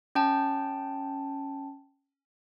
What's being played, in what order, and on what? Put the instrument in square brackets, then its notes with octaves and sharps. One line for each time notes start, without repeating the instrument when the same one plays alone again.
[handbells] C#4 G5 A5